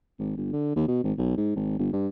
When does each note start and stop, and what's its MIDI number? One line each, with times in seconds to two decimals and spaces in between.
0.19 0.36 32
0.37 0.49 31
0.53 0.73 50
0.76 0.87 39
0.88 0.99 47
1.03 1.12 32
1.18 1.33 35
1.37 1.55 44
1.56 1.76 32
1.79 1.88 31
1.93 2.08 43